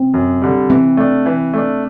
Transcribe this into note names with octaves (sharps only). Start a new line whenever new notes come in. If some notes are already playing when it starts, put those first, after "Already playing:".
Already playing: C4
F#2
D3 G3
E3 C4
A3 D4
E3
A3 D4